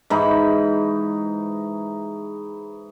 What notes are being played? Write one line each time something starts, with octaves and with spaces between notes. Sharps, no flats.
G#2 E3 D#4 B5